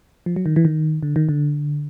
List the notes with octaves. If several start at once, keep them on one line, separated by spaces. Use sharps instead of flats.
F3
F#3
D#3
E3
D#3
D3
D#3
D3